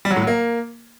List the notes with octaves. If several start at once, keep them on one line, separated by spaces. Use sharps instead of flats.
G3
F#3
A2
F#3
A#3